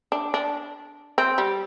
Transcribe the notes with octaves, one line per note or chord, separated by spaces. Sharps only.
D4
D4
C4
G3